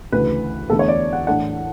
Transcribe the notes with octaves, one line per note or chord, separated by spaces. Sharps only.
D2 C#3 E3 B4
E2 D3 A3 E4 A4
C#5
D5
F#5
A2 E3 A3 D4 F#5